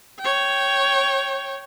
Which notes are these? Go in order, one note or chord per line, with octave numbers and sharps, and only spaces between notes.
C#5 G5